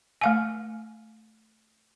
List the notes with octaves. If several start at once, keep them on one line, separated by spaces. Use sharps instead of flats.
A3 F5 G#5